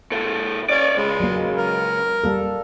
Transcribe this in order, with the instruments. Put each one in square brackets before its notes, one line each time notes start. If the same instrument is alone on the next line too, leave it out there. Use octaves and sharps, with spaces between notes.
[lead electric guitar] A#2 A4
[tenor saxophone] C#4 [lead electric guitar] C#5 D5
[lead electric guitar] C#2 [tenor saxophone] G#3
[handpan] F#3 A#3
[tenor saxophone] A#4
[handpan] G3 A#3 A4